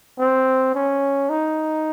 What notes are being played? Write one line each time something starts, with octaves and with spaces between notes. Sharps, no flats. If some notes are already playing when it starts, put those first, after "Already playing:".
C4
C#4
D#4